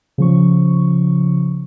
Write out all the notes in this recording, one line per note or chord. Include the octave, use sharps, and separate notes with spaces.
C#3 F3 C#6